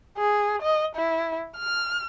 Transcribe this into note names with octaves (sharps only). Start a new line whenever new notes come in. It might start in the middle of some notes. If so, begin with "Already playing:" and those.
G#4
D#5
E4
F6